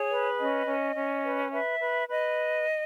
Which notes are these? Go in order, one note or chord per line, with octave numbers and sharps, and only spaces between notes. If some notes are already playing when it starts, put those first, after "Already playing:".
Already playing: G#4 C#5
B4
C#4 D#5
C#4
C#4
B4
B4 E5
B4
B4 D#5